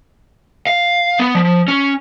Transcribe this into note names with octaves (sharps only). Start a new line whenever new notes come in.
F5
B3
F3
C#4